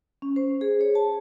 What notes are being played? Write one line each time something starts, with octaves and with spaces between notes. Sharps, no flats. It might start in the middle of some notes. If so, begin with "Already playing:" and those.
C#4
C5
G#4
C#5
A5